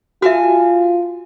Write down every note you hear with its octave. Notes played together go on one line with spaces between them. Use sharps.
F4 F#4 A4 E5 G#5 F6